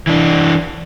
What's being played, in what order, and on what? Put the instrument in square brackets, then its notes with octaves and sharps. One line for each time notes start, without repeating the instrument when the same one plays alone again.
[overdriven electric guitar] E3 D4